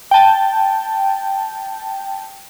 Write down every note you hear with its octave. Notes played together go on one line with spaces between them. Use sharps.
G5 A5